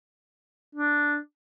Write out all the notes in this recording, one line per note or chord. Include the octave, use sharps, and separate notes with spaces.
D4